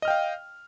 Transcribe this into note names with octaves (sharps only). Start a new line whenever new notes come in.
D#5 F5 G5 F6